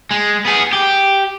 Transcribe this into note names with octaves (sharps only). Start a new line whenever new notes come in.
G#3
B3 G#4
G4